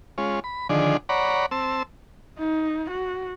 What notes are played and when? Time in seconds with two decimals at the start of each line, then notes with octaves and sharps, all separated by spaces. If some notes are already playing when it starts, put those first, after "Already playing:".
0.18 G#3 C#4 F4
0.44 B5
0.69 D3 D#3 F3 D4 G#4
1.09 C#5 D5 F#5 A#5 B5
1.51 C4 A5 E6
2.39 D#4
2.90 F#4